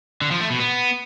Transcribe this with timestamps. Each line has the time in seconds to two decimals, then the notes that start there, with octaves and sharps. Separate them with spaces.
0.22 D3
0.31 F3
0.41 A3
0.50 B2
0.60 B3